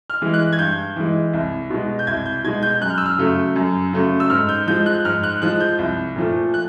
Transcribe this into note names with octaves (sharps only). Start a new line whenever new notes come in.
F6
E3 G#3
F#6
G#6
G2 G6
E3 G#3
C2
B2 G#3
G6
C2 G#6
G6
B2 G#3 G#6
G6
F#2 F#6
F6
E6
F6
C#3 F#3 A3
F#2
C#3 F#3 A3
E6
G#2 F6
G6
F3 G#3 G6
F#6
G#2 F6
F#6
F3 G#3 F#6
G6
C2
A#2 F3 A3
F#6